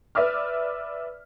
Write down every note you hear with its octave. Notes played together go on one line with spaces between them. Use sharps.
B4 D5 E5 D6 F6